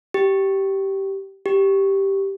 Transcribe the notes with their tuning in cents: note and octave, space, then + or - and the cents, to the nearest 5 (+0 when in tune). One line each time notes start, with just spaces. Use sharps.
G4 -15
G4 -5